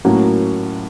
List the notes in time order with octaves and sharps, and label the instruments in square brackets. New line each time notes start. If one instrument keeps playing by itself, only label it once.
[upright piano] A2 F#3 A#3 C#4 F#4